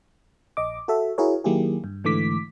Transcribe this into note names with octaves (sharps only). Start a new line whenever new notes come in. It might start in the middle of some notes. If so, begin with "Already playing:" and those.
A#1 D#5 D6
F#4 A4 E5
E4 F#4 G#4 A#4 C#5
D#3 F#3 A#3 E4 G4 G#4
G2
G#2 D3 E3 A3 D6 B6